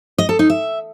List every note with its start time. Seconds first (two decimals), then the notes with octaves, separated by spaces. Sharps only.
0.18 D#5
0.29 A4
0.39 D#4
0.50 E5